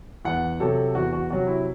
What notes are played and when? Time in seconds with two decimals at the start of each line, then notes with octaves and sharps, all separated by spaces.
0.25 E2 F#5
0.60 C3 F#3 A4
0.95 E2 F#4
1.13 F#4
1.30 C3 F#3 F#4
1.47 E4